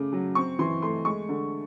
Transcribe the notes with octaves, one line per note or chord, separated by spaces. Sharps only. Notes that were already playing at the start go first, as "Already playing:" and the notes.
Already playing: C#3 A3 D6
F#3
C4 C#6
E3 C6
A3 C6
G#3 C#6
D3